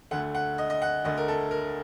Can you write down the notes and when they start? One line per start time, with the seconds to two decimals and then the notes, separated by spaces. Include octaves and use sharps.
0.11 D2 D3 A3 F#5
0.35 F#5
0.58 D#5
0.70 D#5
0.82 F#5
1.04 D2 D3 A3 D#5
1.17 A#4
1.28 A4
1.51 A#4